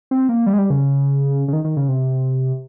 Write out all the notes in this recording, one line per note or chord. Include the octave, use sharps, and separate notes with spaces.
C4
A#3
G3
G#3
G3
C#3
C#3
D#3
D#3
C#3
C3